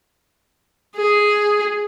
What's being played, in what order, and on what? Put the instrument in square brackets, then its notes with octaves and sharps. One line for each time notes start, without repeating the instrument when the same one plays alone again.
[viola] G#4